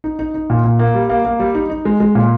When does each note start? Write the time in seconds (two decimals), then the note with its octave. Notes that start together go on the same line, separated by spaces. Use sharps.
0.04 D#4
0.19 D#4
0.34 D#4
0.50 A#2
0.64 A#2
0.79 A#3
0.94 G3
1.09 A#3
1.25 A#3
1.40 G3
1.55 D#4
1.70 D#4
1.85 G#3
2.00 G#3
2.15 A#2